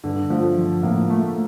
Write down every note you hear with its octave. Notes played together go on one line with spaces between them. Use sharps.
G2 D3
F3 A3
F3
A2 A#3
A3